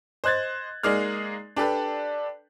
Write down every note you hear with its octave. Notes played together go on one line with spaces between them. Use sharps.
C5 D#5 F#6 G#6 A6
G#3 A#3 D#4 G#4 D5 F6
D4 G4 A4 B4